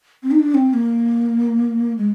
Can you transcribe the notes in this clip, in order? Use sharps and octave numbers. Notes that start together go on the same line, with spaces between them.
C4
D#4
D4
C4
C4
A#3
G#3